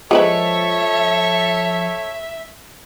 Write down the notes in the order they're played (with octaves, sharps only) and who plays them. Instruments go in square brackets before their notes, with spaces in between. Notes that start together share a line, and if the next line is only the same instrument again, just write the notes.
[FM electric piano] F3 [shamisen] G#3 E4 B4 [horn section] A4 C#5 [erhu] E5